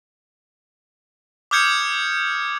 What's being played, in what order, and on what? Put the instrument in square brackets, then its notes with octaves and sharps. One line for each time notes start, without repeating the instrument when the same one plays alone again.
[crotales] D6 D#6 F6 G6 G#6 C#7